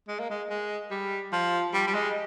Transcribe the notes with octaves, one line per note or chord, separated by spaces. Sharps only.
G#3
A#3
G#3
G#3
G3
F3
G3
G3
G#3